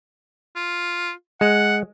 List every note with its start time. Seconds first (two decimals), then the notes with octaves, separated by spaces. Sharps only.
0.56 F4
1.41 G#3 F#5